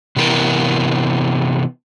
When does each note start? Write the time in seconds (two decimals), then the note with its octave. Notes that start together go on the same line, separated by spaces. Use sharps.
0.16 C3 E3 B3 A#4 G5